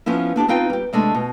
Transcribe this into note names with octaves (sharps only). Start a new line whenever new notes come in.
F3 B3 C#4 E4
B3 D4 D#4 G4
C4 D#4 F4 B4 G5
G3 G4
C3 G#3 A3 D4
B2